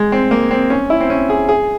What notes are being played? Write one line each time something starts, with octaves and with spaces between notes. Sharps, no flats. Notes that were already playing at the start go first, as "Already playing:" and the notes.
Already playing: G#3
C4
A#3
C4
C#4
E4
C4
C#4
G#4
G#4